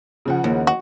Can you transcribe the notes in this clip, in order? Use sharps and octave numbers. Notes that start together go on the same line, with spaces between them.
C#3 F3 F#5
D#2
F#4